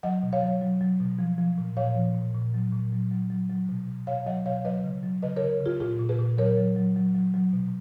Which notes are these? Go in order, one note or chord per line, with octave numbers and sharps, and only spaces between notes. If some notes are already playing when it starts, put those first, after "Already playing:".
F#3 D#5 F#5
B2
C#5 F5
F#3
F#3
F#3
B2
F3
F3
A#2
A#2 C#5 F5
F3
A#2
A#2
F#3
A#2
F#3
F#3
F#3
F#3
B2
B2
B2 C#5 F5
F#3 D#5 F#5
B2 C#5 F5
F#3 B4 D#5
C#3
F#3
C#3 B4 D#5
A#4 C#5
C#3
C#3 F4 G#4
A#2 F4 G#4
A#2
G#4 B4
A#2
F#3 A#4 C#5
F#3
F#3
F#3
F#3
F#3
B2